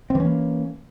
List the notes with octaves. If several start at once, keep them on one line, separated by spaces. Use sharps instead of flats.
E3 A#3 C4 C#4